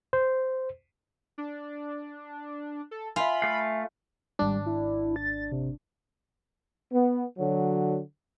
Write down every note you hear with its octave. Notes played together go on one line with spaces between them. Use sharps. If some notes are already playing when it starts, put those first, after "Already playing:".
C5
D4
A4
F4 E5 G#5 B5
A3 F5
G#1 G3 D4
E4
A6
C3
B3
D3 F#3